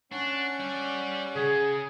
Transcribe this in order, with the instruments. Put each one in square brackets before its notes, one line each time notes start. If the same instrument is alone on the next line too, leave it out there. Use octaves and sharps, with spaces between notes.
[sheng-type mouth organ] C#4 F#5 C#6 [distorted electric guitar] D4
[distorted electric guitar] G3 D5
[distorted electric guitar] C#3 [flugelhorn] G#4